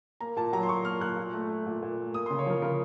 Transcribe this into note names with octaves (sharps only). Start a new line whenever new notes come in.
A#3 A#5
A#2 A5
F#3 A#5
C6
A#2 C#6
A#3 F6
A#2 F#6
A#2
A3
A3
A#2
A#2
A3
A#3 D#6
C#3 C6
C#5
F3 A#4
C#3 A#4